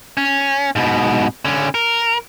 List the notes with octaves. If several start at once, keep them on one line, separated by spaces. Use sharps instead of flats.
C#4
G#2 B2
D3 C#4
A#4